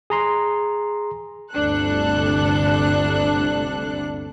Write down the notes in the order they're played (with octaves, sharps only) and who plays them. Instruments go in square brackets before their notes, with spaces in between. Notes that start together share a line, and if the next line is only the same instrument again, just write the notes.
[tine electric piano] G#4 A#5 C6
[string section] G1 D2 C3 D4 A4 F#6